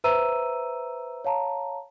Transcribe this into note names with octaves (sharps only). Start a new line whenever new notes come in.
B4 C5 E5 A#5 E6 D#7
C#5 F5 A5 A#5